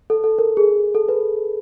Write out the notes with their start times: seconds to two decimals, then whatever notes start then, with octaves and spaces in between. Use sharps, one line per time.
0.10 A4
0.24 A4
0.38 A#4
0.57 G#4
0.95 A4
1.09 B4